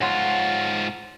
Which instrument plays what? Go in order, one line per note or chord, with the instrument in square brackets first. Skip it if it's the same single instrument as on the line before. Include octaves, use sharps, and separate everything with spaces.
[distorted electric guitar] G#2 F4 [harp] C#5 F#5 C6